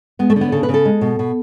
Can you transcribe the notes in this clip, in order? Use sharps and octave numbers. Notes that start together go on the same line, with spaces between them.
G#3 B3
A3
D3
B3
C#3 A4
B4
C#3
A4
G#3
B2
B2